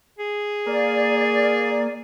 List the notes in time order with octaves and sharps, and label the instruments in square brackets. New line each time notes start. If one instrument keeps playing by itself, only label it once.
[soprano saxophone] G#4
[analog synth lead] A#3 [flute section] D5